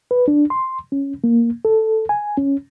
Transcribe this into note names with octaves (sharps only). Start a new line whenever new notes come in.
B4
D4
C6
C#4
A#3
A4
G#5
C#4